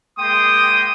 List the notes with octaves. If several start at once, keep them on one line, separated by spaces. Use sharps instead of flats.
G#3 A#3 G5 C6 D#6